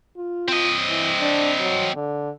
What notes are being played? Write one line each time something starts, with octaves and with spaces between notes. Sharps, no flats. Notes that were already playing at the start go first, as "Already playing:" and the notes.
F4
C4 D#5
E3
D4
F#3
D3